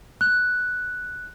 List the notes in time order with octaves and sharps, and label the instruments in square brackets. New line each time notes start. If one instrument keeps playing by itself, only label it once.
[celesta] F#6